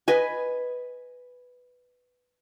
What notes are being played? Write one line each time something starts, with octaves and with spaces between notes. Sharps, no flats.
B4 D#5 G#5